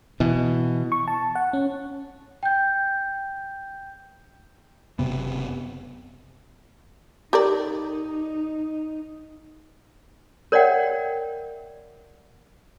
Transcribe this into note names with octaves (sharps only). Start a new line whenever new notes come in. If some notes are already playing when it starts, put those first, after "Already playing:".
B2 E3
C#6
A5
F#5
C#4
G5 G6
F#1 C3 B3
D#4 G4 A#4 D5
A#4 C#5 D5 E5 F#5 G5